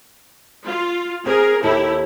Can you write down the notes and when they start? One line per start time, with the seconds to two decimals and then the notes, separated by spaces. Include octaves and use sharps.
0.66 F4
1.26 C4 G#4 A#4
1.63 D#2 E4 G4 A4 D#5